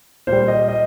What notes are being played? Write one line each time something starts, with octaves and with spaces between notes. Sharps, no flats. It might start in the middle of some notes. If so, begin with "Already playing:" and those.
A#2 C5
G3
D#5
D#5